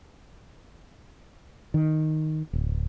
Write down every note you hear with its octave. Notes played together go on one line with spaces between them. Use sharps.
D#3
D1